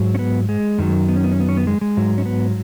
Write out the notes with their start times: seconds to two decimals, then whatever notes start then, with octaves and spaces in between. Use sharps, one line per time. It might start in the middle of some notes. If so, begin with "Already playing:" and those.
Already playing: G#2 F#3
0.15 C#4
0.19 B3
0.49 G#3
0.78 F#2 D#3 F#3
1.09 B3
1.16 C#4
1.24 B3
1.32 C#4
1.40 B3
1.49 C#4
1.57 B3
1.67 G#3
1.81 G#3
1.97 G#2 F#3
2.18 C#4
2.26 B3